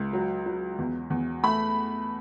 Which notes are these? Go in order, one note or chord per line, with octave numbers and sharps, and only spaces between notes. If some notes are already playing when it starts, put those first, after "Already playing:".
Already playing: C#2
F#3
F#3
E2
E2
A3 B5